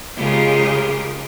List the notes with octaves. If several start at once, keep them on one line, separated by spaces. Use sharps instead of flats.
C#3 G#3 F4 G4 G#4 A#4